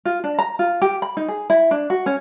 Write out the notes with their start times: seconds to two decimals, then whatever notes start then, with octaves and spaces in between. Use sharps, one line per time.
0.05 F4
0.24 D4
0.39 A#5
0.59 F4
0.82 G4
1.02 B5
1.17 D#4
1.28 G#4
1.50 E4
1.71 D4
1.90 F#4
2.06 C#4